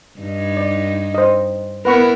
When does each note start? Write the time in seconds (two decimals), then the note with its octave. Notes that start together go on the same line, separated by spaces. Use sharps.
0.20 G2 D#4
0.57 D5
1.15 C5 D#5
1.85 B3 E4 A#4 B4 F#5 C#6